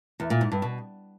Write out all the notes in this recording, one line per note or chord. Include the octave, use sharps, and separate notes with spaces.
E2
A#2
G#2
G2
B2